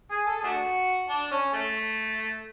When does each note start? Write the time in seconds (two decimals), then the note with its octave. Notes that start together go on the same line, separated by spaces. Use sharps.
0.10 G#4
0.26 A4
0.38 G#4
0.44 A3 D4 F#4
1.09 D4
1.31 C#4
1.53 A3